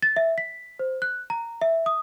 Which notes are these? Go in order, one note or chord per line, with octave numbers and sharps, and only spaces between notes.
A6
E5
B6
C5
F#6
A#5
E5
D#6